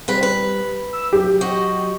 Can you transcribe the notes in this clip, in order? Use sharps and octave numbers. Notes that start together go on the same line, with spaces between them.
G3 C4 B4
B4
E6
F#3 G4
F#4 D#5